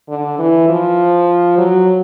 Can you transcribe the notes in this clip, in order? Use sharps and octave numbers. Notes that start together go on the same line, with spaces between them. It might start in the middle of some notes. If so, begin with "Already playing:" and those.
D3
E3
F3
F#3